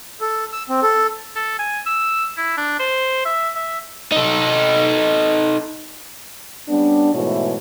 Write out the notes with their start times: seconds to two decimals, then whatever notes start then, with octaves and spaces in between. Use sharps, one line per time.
0.21 A4
0.52 E6
0.69 C4
0.83 A4
1.36 A4
1.59 G#5
1.86 E6
2.37 E4
2.57 D4
2.79 C5
3.25 E5
3.55 E5
4.12 D#4 A4
6.69 G3 B3 C#4 D4
7.14 G#2 B2 E3 A3 E4 C#5